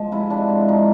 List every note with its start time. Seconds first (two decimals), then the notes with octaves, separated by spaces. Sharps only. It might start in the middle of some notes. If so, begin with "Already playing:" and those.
Already playing: F3 G#3
0.12 C3 E4
0.30 G#3 D4
0.49 G#2
0.68 F3 D#4